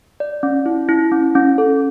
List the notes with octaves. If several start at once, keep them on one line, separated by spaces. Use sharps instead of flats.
D5
C#4
E4
E4
C#4
C#4
A4